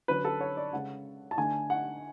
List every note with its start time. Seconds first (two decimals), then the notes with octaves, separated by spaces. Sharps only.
0.08 D3 F#3 C#4 B4
0.25 A4
0.41 C#5
0.57 D5
0.73 C#3 G#3 C#4 F#5
1.31 A5
1.37 D3 A3 D4 G#5
1.70 F#5